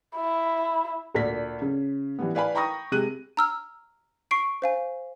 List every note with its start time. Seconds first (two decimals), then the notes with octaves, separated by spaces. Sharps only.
0.16 E4
1.14 D2 A#2 D5 B6
1.62 C#3
2.19 E3 G3 B3
2.35 B4 D5 F5 G#5 B5
2.55 G5 A#5 B5 C#6 D#6 A#6
2.92 C3 G#3 G#4 F#6 D#7
3.37 A#5 E6 F6
4.31 C#6 C7 D7
4.62 C5 F5 G#5